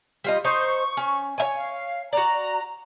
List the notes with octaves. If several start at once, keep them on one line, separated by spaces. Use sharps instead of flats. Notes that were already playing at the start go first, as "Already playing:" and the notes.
G3 F4 D#5
D#4 C5 C#6
C#4
C#5 E5 G#5
F5
F#4 D5 A#5